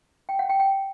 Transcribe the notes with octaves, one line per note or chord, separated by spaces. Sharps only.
G5
F#5
G5
G5